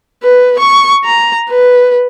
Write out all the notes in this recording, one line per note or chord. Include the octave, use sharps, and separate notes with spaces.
B4
C#6
A#5
B4